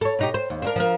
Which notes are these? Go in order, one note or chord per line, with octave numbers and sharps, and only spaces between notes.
A4 C#5
B2 D#4 G4
C5
D#2
C4 D4 A#4
F3 A#4